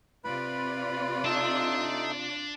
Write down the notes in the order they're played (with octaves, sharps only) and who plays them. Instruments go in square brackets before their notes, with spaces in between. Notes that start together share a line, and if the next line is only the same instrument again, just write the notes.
[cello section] C3 F4 D5 [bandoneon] B4 B5
[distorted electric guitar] D4 A5 [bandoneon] D#4 A4 E5